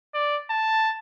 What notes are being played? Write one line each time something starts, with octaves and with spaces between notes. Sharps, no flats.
D5
A5